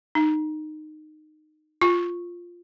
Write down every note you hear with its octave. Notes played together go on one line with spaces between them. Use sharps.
D#4
F4